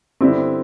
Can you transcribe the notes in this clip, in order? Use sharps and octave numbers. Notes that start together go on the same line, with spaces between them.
D3 G3 B3 C4 E4 G4